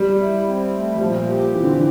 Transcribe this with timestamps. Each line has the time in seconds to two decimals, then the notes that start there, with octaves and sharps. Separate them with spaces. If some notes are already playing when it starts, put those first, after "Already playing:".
Already playing: G3
0.18 E4
0.46 C4
0.73 A3
0.95 G3
1.00 A#2 F3
1.27 G4
1.55 E3 C4
1.63 D3
1.71 E3